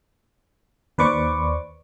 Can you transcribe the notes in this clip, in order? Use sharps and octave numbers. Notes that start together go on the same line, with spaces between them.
D#2 B4 C5 D5 C#6 D6